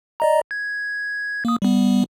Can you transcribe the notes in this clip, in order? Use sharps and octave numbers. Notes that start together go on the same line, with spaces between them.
D5 D#5 A#5
G#6
A#3 D#6
G3 B3